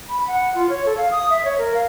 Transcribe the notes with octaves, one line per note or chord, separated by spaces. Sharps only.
B5
F#5
F4
C#5
A4
F5
D#6
E5
C#5
A#4
F5